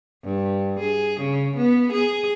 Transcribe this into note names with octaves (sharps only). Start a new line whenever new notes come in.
G2
G#4
C#3
B3
G#4